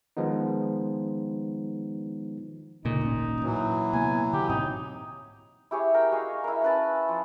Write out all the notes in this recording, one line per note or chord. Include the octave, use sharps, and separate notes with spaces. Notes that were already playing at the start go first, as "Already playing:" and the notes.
D#3 F3 G#3 B3 D#4
D2 A#2 C#3 D#4
D1 G#1 C#4
A2 E3 F#3
C3 A#3 B3 G#5
D3 G4
G#2 B2 C4 D#4
E4 G4 G#4 C#5
A#4 G5
F#4 G#4 D#5 F5
E4 A#4
C#4 B4 A5
F3